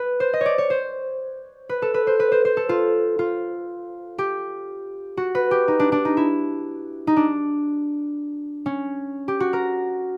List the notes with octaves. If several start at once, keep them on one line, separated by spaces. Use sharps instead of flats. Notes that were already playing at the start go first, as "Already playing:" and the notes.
Already playing: B4
C5
D#5
C#5 D5
C#5
C5
B4
A4
B4
C5
B4
C5
C5
A4
F4
F4
G4
F#4
B4
G4
D#4
D4
D4
D#4
E4
D#4
D4
C#4
G4
F#4
A#4